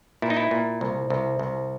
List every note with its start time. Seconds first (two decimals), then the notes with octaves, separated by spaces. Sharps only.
0.22 A#2 E4
0.30 D#4
0.37 E4
0.51 A#2
0.81 C2
1.10 C2
1.39 C2